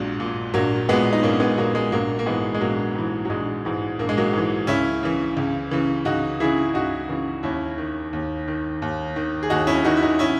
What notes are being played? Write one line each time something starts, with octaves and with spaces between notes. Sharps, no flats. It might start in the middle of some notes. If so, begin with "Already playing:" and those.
Already playing: A#1 A#2 F#3 G#3
A#2
A#1 F#3 A#3
A#2 G#3 B3
D#4
A#1 A#3 C#4
G#3 B3
A#2 F#3 A#3
G#3
A#1 F#3 A#3
A#3
G#2 E3 G#3 B3
G#3
A#1 F#3 A#3
G#2 E3
F#3
A#1 G#3
G#2 E3
A#1 A#3
G#3
F#3 A#3
G#2 E3
C#2 C#4 E4
C#3 E3
C#2
C#3 E3
C#2 D#4 F#4
C#3 E3 E4 G#4
C#2 D#4 F#4
C#3 E3
D#2 C#4 E4
D#3
D#2
D#3
D#2
D#3
G#4
D#2 D#4 F#4
C#4 E4
D#3 D#4 F#4
E4
D#4 F#4
C#4 E4